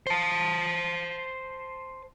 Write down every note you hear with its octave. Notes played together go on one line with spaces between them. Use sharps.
C5 A5